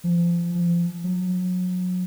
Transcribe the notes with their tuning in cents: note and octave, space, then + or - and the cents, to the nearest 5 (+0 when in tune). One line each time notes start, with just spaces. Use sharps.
F3 -25
F3 -25
F#3 -30